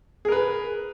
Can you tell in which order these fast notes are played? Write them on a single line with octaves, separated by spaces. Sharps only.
G#4 A#4 B4